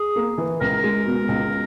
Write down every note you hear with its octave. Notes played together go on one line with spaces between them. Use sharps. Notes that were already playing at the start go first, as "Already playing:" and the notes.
Already playing: G#4
A#3
E3
C#2 A#4
G#3
B2
C#2